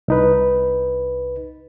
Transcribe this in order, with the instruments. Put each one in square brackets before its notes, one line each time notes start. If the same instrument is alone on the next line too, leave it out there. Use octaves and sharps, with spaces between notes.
[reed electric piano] C2 D#4 B4